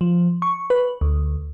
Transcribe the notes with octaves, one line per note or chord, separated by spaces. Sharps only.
F3
C#6
B4
D2